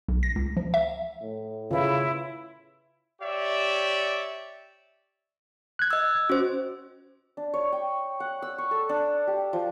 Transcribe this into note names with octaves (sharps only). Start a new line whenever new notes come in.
B1
A#6
C#2
F3
E5
A2
C#3 E4 F4 B4 C#5
G4 C#5 D5 E5
F#6 G#6
D#5 E6
C#4 F#4 C5
D4
C#5
G5
F#5
E6
C#6
A4
D4
G4
F3